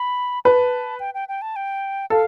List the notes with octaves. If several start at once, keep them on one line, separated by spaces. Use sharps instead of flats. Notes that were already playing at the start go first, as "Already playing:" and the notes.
Already playing: B5
B4 A5
G5
G5
G5
A5
G5
A4 F5